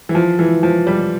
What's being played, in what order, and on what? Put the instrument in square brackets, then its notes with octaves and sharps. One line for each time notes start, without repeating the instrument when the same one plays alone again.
[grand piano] E3
F3
E3
F3
G3